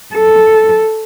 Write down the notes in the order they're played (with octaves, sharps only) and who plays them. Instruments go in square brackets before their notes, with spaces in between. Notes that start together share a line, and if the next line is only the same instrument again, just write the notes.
[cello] A4